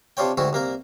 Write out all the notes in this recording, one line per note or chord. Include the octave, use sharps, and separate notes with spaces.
C3 D4 F4 C#5 G5
D2 G#2 D#3 E4 F#4
C2 A#3 A#4